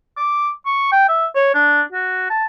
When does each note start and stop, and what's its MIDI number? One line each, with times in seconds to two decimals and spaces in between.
0.17 0.49 86
0.66 0.88 85
0.92 1.08 79
1.09 1.26 76
1.35 1.51 73
1.55 1.82 62
1.92 2.29 66
2.30 2.46 81